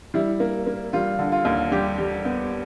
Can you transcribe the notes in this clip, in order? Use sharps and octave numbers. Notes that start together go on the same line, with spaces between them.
G3 E4
A#3
A#3
G3 F4
D3
F4
D#2
G3 G4
G3
B3